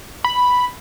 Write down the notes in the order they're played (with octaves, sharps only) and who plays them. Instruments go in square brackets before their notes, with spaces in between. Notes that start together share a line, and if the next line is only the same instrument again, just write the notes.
[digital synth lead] B5